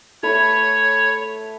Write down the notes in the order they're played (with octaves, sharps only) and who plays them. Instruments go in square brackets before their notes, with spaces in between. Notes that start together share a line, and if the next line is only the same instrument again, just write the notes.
[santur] A3 B4 [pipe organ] C#5